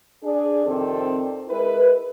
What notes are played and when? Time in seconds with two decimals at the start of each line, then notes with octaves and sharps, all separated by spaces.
0.24 D4 G#4 D5
0.65 F2 C3 D#3 C4 A4 D5
1.49 G#3 E4 A#4 B4